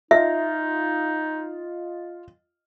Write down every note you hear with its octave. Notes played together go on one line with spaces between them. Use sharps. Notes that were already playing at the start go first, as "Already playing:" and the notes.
D#4 F4 D#5 E5